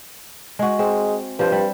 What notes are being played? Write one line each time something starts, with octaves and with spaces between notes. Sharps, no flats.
G#3 F#4
G#3 C4
G2 F3 C5
G3